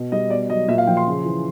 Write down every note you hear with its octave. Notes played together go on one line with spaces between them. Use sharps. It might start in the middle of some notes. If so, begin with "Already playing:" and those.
Already playing: B2
G3 D#5
B2 D5
F#3 D#5
A#2 E5
F5
F3 G5
C6
C#3
E3